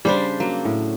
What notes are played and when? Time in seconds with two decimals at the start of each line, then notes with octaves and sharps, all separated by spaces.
0.05 C#3 G3 D4 C5 B5
0.40 F#3 A#3
0.65 A2